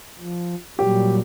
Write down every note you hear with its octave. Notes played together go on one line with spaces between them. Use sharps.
F3
A#2 F#3 G3 G4